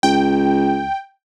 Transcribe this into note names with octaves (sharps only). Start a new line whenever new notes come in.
C#2 G5